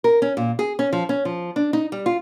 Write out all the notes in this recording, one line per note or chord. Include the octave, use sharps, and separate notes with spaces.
A#4
C#4
A#2
G#4
C#4
F3
C#4
F3
D4
D#4
G3
F4